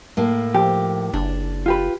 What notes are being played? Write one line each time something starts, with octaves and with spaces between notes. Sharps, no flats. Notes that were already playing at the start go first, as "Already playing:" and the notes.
A2 A#3
F3 G4
F#1 D4
F4 G4 B4